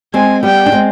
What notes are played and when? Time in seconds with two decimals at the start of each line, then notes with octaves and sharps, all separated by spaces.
0.14 G#3 C4 G#5
0.43 G3 B3 G5
0.66 D4
0.72 G#3 C4